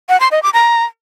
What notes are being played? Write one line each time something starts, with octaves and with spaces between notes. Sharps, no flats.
F#5
C6
D#5
D6
A#5